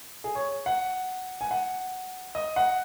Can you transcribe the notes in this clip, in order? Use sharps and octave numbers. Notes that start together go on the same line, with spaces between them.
G#4
C#5
F#5
G#5
F#5
D#5
F#5